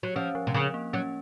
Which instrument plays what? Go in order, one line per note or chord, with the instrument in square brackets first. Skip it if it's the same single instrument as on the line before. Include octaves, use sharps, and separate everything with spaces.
[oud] F#3
[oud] F3 [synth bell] C#4
[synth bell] F3
[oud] C3
[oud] C#3 [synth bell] F3
[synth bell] A#3
[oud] F#3 [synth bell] C#4